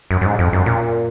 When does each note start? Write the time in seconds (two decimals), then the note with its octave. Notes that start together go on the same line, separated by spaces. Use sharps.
0.11 F#2
0.21 F#2
0.26 G#2
0.39 F2
0.53 F#2
0.66 A#2